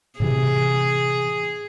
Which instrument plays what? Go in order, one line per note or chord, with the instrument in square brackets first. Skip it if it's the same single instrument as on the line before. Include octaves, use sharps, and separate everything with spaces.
[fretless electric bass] A2 C3 E3 [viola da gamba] G#4